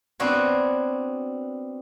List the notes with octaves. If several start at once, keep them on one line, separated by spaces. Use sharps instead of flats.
B3 C4 D4 F#4 C5 C#5